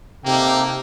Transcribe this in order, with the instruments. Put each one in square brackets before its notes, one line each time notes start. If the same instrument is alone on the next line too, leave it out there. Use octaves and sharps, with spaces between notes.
[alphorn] C3 [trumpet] A#3 [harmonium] D#4 G4 A4 [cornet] G5